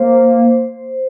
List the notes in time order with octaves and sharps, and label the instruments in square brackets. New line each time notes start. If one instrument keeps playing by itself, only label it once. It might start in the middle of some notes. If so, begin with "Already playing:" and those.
Already playing: [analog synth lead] A#3 [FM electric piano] C5